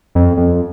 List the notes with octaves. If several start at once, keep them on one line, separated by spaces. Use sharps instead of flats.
F2
F2